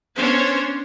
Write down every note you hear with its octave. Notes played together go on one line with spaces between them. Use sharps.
B3 C#4 D4 C5 C#5